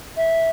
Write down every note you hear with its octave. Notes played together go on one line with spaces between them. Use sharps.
E5